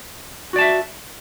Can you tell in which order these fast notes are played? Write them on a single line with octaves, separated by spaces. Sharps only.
F#4 D5 A5 E5